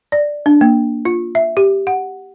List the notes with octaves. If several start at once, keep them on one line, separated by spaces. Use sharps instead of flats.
D5
D4
A#3
F4
E5
G4
F#5